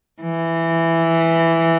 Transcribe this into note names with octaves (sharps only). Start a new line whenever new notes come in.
E3